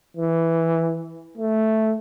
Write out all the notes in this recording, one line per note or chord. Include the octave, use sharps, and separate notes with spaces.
E3
A3